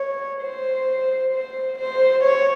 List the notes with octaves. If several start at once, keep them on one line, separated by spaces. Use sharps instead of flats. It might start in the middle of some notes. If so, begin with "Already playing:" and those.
Already playing: C#5
C5
C5
C5
C#5